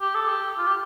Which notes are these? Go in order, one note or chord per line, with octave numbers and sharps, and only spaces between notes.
G4
A4
G4
F4
G4